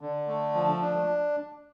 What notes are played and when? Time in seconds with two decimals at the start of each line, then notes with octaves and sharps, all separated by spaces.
0.01 D3
0.28 A3
0.54 F3
0.82 D4